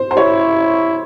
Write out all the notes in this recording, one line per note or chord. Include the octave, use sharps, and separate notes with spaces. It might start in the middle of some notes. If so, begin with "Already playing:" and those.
Already playing: C5
C5
E4 C#5